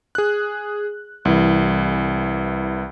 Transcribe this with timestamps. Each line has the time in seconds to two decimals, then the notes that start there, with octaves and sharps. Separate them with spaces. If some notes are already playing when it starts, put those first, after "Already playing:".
0.15 G#4 F#6
1.25 C2 E3